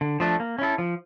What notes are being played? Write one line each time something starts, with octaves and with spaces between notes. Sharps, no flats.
D3
F3 A3 D4
A#3
C#4 E4 A4
F3